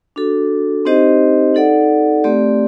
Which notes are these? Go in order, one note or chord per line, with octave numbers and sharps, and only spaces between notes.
D4 F#4 A4
C4 D#4 G4 C5 D#5
D#4 A4 D5 F#5
A3 C4 G4 D5